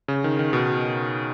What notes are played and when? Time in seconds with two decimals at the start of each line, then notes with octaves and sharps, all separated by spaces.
0.08 C#3
0.24 D#3
0.39 D#3
0.53 B2